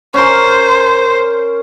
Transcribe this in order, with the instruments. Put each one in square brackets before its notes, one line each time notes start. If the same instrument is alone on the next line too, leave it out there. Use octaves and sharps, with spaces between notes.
[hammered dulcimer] C#4 A#4 [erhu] C5